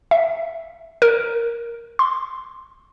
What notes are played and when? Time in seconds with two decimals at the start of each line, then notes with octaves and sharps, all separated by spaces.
0.11 E5
1.02 A#4
1.99 C6